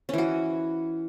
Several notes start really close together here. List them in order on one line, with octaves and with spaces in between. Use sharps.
C#4 E3 F#4